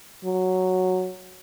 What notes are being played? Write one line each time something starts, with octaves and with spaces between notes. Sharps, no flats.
F#3